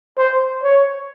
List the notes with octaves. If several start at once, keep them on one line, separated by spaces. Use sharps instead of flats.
C5
C#5